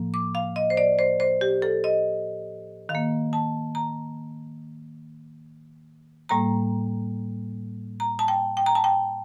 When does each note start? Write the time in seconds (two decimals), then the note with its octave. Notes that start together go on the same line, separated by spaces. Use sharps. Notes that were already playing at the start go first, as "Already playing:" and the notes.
Already playing: A2 F3 A#3
0.14 D6
0.35 F5
0.56 D#5
0.70 C5
0.77 D5
0.99 C5
1.20 C5
1.41 G4
1.62 A4
1.84 D#5
2.89 D#3 F5
2.95 A#3
3.33 A5
3.75 A#5
6.29 A2 G3 A#3 A#5
8.00 A#5
8.19 A5
8.28 G5
8.57 G5
8.66 A#5
8.75 A5
8.84 G5